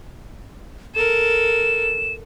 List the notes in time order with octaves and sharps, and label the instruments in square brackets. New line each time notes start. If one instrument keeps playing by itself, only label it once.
[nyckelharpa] A4 A#4 [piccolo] E7